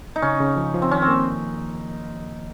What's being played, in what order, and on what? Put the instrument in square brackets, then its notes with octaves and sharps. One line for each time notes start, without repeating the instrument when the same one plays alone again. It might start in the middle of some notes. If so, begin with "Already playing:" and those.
[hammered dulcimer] D#4
[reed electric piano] C#3 [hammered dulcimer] C#4
[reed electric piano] C#3
F3
F3
[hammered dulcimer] C4
[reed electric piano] D#3 [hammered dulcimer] C#4
[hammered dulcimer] C4
[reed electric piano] A#3